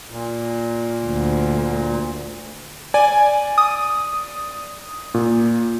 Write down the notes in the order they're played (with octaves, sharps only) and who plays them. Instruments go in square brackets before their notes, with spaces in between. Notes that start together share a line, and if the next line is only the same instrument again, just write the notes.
[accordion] A#2
[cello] D2
[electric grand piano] D5 [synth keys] G#5
[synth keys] D#6
[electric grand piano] A#2